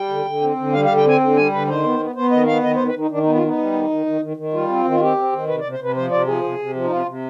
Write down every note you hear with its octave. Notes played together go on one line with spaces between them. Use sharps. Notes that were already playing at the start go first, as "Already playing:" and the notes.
Already playing: G3 G5
D3
D3
C4
D3
G3 F5
F5
D3
G5
C4 G#5
D3
G3 G#5
D3 B4
D#3 C5
B3
B3
B3 C5
D#3 D#5
B3 F5
D#3 D#5
C5
D#3
B4
D#3 D#4
D#3 D4
D#4
B3
F4
B3 D#4
G3
D#3
D#3
D#3
D#3
D#3
G3 F4
C4
D#3
F4
C4 G4
C4
D#3
C3 B4
D5
C3
C5
C3 B4
F3 C5
C3 D5
F3 G#4
C3
C3
F3
D#4
C3 F4
C3